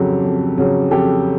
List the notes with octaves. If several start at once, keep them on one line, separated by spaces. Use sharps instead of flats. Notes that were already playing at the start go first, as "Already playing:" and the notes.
Already playing: F2 C#3 F#3 G4 A4
F2
C#3 F#3
F2 G4 A4